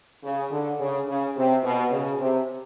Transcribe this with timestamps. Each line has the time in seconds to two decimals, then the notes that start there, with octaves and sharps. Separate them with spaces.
0.24 C#3
0.51 D3
0.80 C#3
1.08 C#3
1.36 C3
1.64 B2
1.91 C#3
2.20 C3